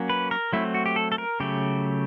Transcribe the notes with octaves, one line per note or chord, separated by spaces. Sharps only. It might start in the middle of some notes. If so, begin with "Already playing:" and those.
Already playing: F#3 A#3 C#4
B4
A#4
F#3 A3 C4 E4
F#4
G4
A4
A4
A#4
C#3 F#3 A3 G4